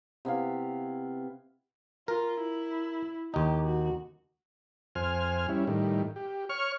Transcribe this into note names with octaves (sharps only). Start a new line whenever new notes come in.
C3 B3 E4 F5
F4 A#4
E4
D#2 D#4 G4
F#4
F2 C5 G#5 F6
G3 C#4 E4
A2 D#3 G3
G4
C#5 C#6 F6